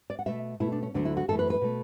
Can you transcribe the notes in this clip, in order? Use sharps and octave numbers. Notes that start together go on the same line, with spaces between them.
D5
F#5
B2 A3 E5
B2 A3 E4
D4
C#4
D2 D3 F#3 A3 D4
E4
F#4
F#2 E3 A3 A4
B4
B4
B2 A3